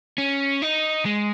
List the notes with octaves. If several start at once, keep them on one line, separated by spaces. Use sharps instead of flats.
C#4
D#4
G#3